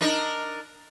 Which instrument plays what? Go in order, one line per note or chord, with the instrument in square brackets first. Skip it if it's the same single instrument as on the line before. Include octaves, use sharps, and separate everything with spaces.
[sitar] D4 D#4 A#4